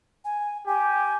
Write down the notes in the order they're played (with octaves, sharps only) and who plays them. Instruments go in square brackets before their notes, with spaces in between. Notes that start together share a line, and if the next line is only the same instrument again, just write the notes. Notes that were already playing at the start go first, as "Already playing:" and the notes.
[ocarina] G#5
[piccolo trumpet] G4 [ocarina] G#5